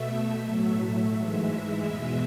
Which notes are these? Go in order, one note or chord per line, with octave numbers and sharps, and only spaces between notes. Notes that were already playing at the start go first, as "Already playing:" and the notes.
Already playing: B2 A3 E5
A2 F#3 A3
G#2 E3 G#3
E2 B2 G#3